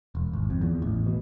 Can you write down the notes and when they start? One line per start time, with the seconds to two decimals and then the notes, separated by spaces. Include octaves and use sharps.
0.15 E1
0.33 G#1
0.50 F2
0.61 E2
0.82 A1
1.06 B2